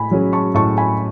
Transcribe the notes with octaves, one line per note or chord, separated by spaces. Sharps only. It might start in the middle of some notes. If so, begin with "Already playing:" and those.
Already playing: A2 G#5 B5
F#3 C#4 G#4
A5 C#6
A2 A5 C#6
G#5 B5